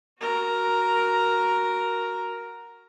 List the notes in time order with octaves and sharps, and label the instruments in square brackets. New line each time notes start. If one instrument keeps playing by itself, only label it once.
[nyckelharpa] F#4 A#4